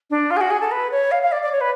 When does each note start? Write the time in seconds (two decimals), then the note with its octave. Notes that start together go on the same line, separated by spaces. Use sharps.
0.10 D4
0.30 F4
0.36 G#4
0.41 F#4
0.50 G#4
0.61 A4
0.71 B4
0.91 C#5
1.11 F5
1.22 F5
1.32 D5
1.42 D5
1.52 C#5
1.61 B4